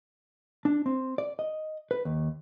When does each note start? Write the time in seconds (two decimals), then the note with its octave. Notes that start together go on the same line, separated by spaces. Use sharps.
0.65 D4
0.86 C4
1.18 D5
1.39 D#5
1.91 B4
2.05 D#2